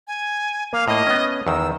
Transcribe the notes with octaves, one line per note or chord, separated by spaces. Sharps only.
G#5
A#3 F5
A2 A#3 D#5
B3 C#4
E2 D#3 E6